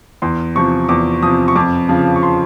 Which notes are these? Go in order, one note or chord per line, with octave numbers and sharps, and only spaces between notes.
E2 C6
C3 F3 C#6
E2 D6
C3 F3 D#6
C#6
F2 D6
C#3 F3
C#6
C6